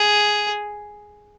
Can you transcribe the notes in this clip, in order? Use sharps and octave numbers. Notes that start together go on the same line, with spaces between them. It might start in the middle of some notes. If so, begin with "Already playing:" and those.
Already playing: G#4